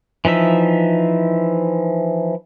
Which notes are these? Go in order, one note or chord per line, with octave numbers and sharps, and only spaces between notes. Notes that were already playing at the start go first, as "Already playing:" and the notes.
E3 F3 D#4 E5